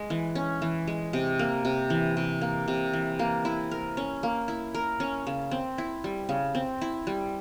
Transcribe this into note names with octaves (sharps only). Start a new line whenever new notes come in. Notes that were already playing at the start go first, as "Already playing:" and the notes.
Already playing: G#3
E3
C#4
E3
G#3
C3
A#3
C3
E3
C3
A#3
C3
E3
A#3
E4
A#4
C#4
A#3
E4
A#4
C#4
C#3
C4
E4
G3
C#3
C4
E4
G3